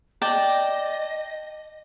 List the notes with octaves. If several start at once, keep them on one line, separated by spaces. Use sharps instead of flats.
D5 D#5 G5 A5